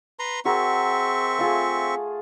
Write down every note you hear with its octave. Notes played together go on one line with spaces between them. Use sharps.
B4 A#5 C6
C4 F#4 G#4 A#4 E5 C#6
A3 F4 G#4